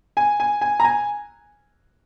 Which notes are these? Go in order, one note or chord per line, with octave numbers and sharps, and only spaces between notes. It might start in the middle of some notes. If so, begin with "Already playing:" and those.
G#5
G#5
G#5
A#5
G#5